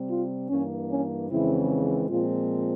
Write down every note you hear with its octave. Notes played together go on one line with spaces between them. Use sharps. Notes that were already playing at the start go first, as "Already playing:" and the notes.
Already playing: C3 G3 C4
F4
G2 E3 A#3 C#4
C#4
F2 C#3 E3 G#3 C4 E4
A#2 F3 G#3 C4 F4